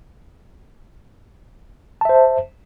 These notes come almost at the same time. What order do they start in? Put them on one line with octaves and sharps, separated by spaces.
A5 E5 C5